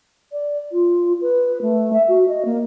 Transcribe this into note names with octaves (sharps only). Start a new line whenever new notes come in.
D5
F4
B4
A3
E5
F#4
D#5
A#3